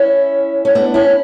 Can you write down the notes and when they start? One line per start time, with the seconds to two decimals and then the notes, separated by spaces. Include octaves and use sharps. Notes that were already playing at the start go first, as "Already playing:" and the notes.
Already playing: C#4 E4
0.65 C#4
0.75 B3 D4
0.94 C#4 E4